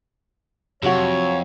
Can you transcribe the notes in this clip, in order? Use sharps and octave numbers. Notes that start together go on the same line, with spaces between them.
F2 C3 F#3 F#4 C#5